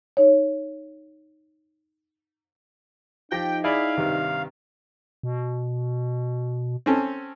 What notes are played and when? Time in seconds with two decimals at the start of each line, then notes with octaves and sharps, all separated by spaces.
0.17 D#4 C#5
3.32 F3 D#4 G4 G5 A#6
3.64 E4 G#4 D5 F5
3.97 G2 C3 D#3
5.23 B2
6.86 C4 C#4 A4